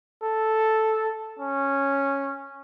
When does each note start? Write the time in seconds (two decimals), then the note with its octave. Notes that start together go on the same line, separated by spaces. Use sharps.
0.23 A4
1.39 C#4